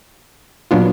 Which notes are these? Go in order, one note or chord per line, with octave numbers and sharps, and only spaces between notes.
A#2 F#3 B3 D4 F4